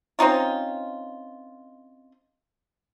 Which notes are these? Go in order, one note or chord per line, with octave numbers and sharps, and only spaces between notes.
C4 C#4 D#4 F4